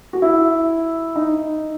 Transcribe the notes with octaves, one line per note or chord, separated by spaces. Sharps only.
F#4
E4
D#4